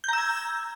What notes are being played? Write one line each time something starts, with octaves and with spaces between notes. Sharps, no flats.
A#5 E6 G6 G#6